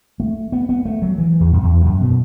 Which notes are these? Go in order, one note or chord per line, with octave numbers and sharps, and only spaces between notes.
A3
B3
B3
A3
F#3
E3
E2
F#2
E2
F#2
B2